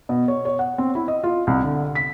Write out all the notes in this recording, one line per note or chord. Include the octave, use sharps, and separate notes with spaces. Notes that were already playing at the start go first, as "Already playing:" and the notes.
B2
C#5
C#5
F#5
C4
E4
D#5
F4
C2
D3
B6